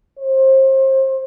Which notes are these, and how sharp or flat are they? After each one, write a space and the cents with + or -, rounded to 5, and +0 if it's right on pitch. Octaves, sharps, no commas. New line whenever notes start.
C5 +30